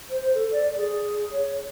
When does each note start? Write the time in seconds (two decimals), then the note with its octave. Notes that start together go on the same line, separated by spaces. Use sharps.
0.11 C5
0.35 A4
0.52 D5
0.77 G#4
1.31 C#5